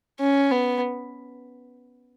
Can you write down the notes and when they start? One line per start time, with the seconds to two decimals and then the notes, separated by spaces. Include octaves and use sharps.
0.20 C#4
0.51 B3